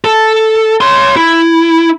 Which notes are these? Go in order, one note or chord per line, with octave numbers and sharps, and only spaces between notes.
A4
C#5 C6
E4